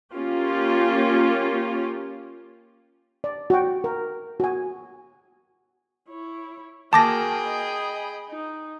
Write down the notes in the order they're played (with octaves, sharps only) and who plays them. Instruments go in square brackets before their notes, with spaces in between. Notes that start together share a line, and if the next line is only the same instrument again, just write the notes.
[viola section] A#3 C#4 F4 G4
[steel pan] D5
F#4 G5
A#4
F#4 G#5
[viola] E4 C#5
[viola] A#3 F#4 [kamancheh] G#4 G5 [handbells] A5 D6 A#6
[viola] D#5 B5
D#4